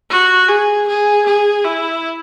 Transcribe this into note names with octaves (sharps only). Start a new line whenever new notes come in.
F#4
G#4
G#4
G#4
E4